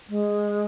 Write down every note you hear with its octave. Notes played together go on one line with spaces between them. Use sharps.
G#3